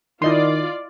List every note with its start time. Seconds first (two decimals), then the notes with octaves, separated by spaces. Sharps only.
0.22 D#3 E4 F4 D5 D#5 C6